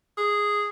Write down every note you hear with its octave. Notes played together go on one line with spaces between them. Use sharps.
G#4